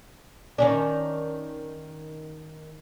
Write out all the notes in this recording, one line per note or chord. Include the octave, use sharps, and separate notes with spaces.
D#3 C#4 D4